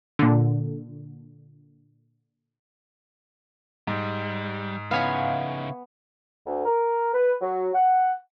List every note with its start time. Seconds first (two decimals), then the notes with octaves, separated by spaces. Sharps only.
0.19 A#2 D3
3.87 G#2 G3
4.91 C#3 B3 D#4 E4 C#5 F5 G#5
6.46 D2
6.65 A#4
7.13 B4
7.41 F#3
7.74 F#5